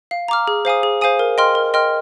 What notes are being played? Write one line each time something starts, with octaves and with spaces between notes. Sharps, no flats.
F5
A#5 D6 F6
G#4
C5 F5 G#5 D#6
G#4
C5 F5 G#5 D#6
A#4
D#5 G5 C6 F6
A#4
D#5 G5 C6 F6